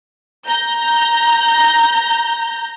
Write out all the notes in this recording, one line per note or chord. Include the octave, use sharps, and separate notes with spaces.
A#5 G6